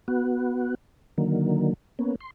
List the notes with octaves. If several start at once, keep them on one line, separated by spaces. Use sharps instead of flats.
B3 F#4
D3 D#3 F#3 A#3
A#3 B3 C#4
C6